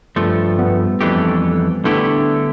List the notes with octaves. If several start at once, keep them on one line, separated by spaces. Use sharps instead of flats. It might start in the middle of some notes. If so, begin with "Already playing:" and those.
G2 F3 A3
G3 B3
F2 E3 A3 D4 G4
D3 A3 B3 D4 E4 G4